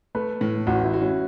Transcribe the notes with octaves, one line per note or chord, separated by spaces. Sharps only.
A3 B4
A2
A1 F#4
E4
F#4
C#4